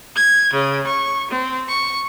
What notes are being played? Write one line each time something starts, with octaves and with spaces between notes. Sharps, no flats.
G#6
C#3
C#6
C4
C#6